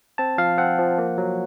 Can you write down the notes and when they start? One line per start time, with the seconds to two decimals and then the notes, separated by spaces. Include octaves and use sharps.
0.18 C4 A5
0.38 F3 F5
0.58 C4 F#5
0.79 F3
0.98 A#3
1.18 F#3